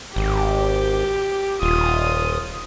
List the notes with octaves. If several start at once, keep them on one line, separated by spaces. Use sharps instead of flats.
G#1 G4
D#1 F4 D#6